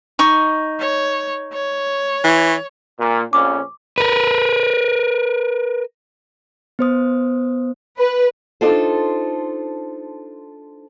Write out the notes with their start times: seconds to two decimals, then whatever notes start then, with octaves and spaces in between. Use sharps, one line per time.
0.19 D#4 C#6
0.80 C#5
1.53 C#5
2.24 E3
2.99 A#2
3.33 A#1 F2 C#4 D6
3.98 A#4 B4
6.79 B3 C5 D#6
7.98 B4
8.61 D4 D#4 F4 A4 C5